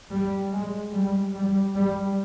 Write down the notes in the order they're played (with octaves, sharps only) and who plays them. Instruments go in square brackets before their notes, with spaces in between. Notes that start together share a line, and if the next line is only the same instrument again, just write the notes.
[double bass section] G3
G#3
G3
G3
G3